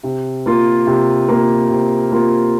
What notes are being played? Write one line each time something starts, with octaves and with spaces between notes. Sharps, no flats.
C3
A#3 F4
C3
A#3 F4
C3
A#3 F4